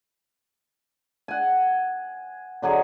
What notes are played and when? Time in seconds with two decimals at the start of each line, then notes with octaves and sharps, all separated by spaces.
1.28 F#5 G#5
2.62 D3 F#3 D#4 G#4